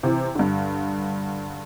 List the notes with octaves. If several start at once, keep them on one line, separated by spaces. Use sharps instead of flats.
C3 E3
G2 D3